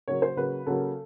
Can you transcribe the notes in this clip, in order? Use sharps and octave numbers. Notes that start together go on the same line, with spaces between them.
C#3 F#3 A#3 C#5
C5
C#3 F#3 A#3 B4
C#3 F#3 A#3 A4